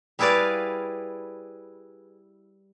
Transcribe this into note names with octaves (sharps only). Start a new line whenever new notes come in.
G3 E4 G#4 B4 D5 F5